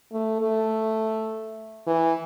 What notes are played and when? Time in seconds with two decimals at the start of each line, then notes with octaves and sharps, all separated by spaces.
0.13 A3
0.42 A3
1.87 E3